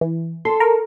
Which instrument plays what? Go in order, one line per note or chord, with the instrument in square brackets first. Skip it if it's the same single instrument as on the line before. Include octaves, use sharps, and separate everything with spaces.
[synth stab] E3
[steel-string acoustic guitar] A4 [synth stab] C6
[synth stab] A#4